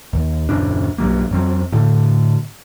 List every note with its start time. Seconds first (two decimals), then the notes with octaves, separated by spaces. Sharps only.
0.13 D#2
0.49 D#1 F#2 C#3 D4
0.98 B1 G2 F#3 A#3
1.31 F2 F#3 C4
1.72 A2 D3